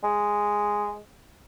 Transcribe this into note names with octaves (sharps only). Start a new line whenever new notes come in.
G#3